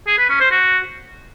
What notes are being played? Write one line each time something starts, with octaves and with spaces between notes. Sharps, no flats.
G#4
B4
C#4
C5
F#4